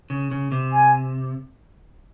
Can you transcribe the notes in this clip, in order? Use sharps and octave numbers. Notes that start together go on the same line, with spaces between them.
C#3
C#3
C3
G#5